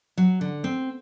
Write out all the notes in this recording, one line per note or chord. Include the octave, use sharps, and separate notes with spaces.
F#3
D3
C4